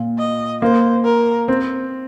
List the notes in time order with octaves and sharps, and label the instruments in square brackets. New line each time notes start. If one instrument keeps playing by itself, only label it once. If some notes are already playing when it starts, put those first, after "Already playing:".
Already playing: [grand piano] A#2
[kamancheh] D#5
[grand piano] A#3 [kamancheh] C5
[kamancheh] A#4
[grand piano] C4